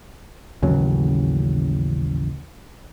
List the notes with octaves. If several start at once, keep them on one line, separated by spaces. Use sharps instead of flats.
A1 D#2 C#3 F#3